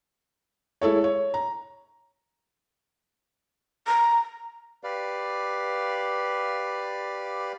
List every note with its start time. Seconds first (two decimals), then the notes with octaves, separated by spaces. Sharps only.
0.81 G#3 E4 A4 C#5
1.04 C#5
1.34 A#5
3.87 A#5
4.84 G4 B4 D5 F5